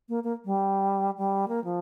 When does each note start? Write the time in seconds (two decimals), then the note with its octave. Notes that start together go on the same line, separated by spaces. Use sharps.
0.09 A#3
0.24 A#3
0.45 G3
1.17 G3
1.48 A#3
1.64 F3